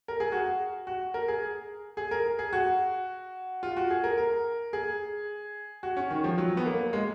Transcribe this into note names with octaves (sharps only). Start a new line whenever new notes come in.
A#4
G#4
F#4
F#4
A#4
G#4
G#4
A#4
G#4
F#4
F4
F#4
G#4
A#4
A#4
G#4
F#4
C#4
D#3
F3
F#3
B3
A#3
G#3